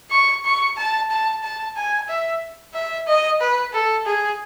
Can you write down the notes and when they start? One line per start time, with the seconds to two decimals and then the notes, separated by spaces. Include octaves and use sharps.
0.11 C#6
0.44 C#6
0.77 A5
1.10 A5
1.43 A5
1.76 G#5
2.08 E5
2.74 E5
3.07 D#5
3.41 B4
3.73 A4
4.06 G#4